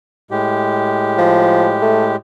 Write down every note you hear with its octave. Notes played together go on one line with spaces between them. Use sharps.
A2 G#3 G4
F3
A3